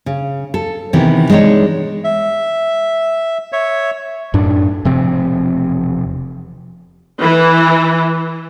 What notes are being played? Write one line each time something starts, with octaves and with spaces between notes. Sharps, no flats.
C#3
A4
C3 D#3 E3 B3
G#3 D4 D#4 A#4 C#5
E5
C#5 E5
F#2 A2 D4
E1 C3 F3 C4
E3